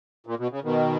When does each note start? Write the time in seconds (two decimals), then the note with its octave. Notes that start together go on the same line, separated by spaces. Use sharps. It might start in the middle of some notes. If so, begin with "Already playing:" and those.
0.26 A#2
0.39 B2
0.51 C#3
0.64 B2 D#3